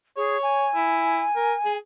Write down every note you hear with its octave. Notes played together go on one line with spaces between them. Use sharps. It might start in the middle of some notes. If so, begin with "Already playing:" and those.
G#4 C#5
G#5
E4
A#4
G#4